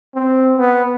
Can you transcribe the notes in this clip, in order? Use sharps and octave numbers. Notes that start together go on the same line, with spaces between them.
C4
B3